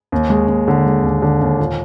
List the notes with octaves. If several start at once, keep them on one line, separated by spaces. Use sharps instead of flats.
D#2
G#3
D#2
D3
G#3
D#2
D3
D#2
A#2